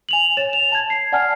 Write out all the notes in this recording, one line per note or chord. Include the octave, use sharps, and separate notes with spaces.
G#5 F7 F#7
C#5 A6 E7
F7
A5 G#6
C7
D5 F#5 G#5 A5 F6